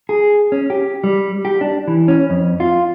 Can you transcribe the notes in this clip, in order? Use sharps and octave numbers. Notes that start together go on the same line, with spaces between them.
G#4
C#4
G4
G3
G4
D4
E3
C#4
F2
F4